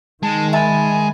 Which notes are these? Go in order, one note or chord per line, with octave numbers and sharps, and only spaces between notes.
D#3 G#3 A5
E5 G#5 A5 B5